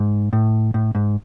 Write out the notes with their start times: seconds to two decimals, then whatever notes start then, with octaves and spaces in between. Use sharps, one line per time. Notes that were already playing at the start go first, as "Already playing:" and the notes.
Already playing: G#2
0.33 A2
0.74 A2
0.95 G#2